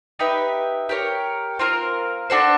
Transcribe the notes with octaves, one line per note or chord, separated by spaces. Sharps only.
D#4 G4 B4 E5
G4 A#4 C#5
C4 F4 A#4
D4 F#4 A4 C5